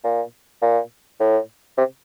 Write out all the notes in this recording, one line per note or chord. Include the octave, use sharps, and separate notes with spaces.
A#2
A#2
A2
C3